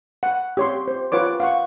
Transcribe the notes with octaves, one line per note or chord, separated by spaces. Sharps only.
F#5
G4 C#5 C6
C5
F4 B4 C#5 D6
F5 F#5 C#6